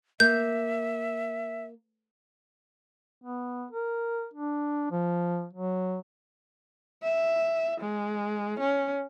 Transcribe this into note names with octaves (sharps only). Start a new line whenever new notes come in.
A#3 E5 G6
B3
A#4
D4
F3
F#3
E5
G#3
C#4